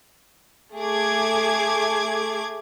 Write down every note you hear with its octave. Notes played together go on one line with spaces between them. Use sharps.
A3 G#4 D6 G#6